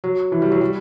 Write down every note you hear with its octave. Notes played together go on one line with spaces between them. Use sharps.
F#3
E3
G3
F#3
G3